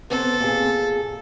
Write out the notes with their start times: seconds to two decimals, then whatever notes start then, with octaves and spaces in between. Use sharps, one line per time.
0.10 B3 C4 A4
0.40 A#2 G#4